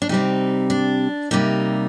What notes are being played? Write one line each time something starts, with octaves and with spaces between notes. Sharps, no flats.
D4
C3 G3 C4 D#4
D4
C3 G3 A#3 D#4